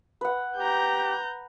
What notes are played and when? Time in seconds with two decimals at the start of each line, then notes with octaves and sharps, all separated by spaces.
0.21 B4 F#5
0.57 G4 A#5 G6